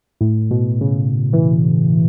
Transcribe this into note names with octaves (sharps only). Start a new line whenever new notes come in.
A2
B2
C#3
E3